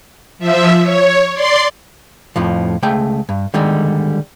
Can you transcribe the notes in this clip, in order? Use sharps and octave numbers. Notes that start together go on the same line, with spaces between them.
F3 E5
C#5
D5 C6
F2 A2 F3
C#2 A3 G#4 G5
G2
D3 D#3 G3 G#3